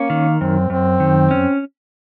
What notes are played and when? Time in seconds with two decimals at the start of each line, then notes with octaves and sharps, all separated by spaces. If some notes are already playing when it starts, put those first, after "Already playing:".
Already playing: A#3 C#4
0.10 D#3
0.41 F#2 C4
0.70 F#2 C4
1.00 D#3
1.31 C#4